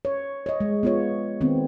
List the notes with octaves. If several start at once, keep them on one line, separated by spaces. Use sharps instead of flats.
C#5
C#5 D#5
G#3
B3 F4 C#5
D#3 B3 C4